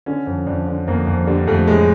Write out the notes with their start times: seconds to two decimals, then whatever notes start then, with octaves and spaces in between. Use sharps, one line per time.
0.06 D3 C#4
0.27 F2
0.46 F2 D4
0.67 D3
0.87 F2 A#3
1.07 F2
1.27 D3 G3
1.47 F2 A3
1.67 A2 G#3